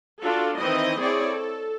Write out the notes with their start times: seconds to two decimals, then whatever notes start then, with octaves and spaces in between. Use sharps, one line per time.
0.22 D4 F4 F#4 A4
0.58 D#3 E3 C4 E4 D#5
1.00 C4 E4 G#4 C#5 D5
1.31 A4